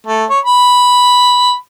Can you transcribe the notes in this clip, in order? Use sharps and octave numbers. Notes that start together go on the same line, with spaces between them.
A3
C#5
B5